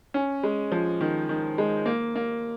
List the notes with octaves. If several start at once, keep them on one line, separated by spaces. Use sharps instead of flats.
C#4
G#3
F3
D#3
D#3
G#3
A#3
A#3